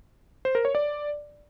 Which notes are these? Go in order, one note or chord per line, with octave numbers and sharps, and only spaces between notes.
C5
A#4
C#5
D5